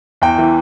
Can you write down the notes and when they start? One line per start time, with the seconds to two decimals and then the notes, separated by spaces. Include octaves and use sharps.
0.22 E2 G5
0.38 E3